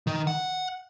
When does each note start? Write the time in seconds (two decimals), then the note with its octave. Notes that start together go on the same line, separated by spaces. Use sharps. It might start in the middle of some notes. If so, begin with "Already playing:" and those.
0.07 D#3
0.27 F#5